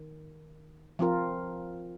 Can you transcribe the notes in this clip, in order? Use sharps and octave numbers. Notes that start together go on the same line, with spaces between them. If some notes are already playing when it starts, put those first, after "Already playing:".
Already playing: D#3
F3 C4 F4 A#4